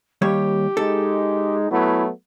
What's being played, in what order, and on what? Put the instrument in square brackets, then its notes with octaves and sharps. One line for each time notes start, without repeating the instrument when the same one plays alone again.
[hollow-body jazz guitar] D#2 G3 C#5 [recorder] G4
[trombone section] G#3 D#4 [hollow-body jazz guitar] A4
[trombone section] F#3 A3 B3 [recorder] E4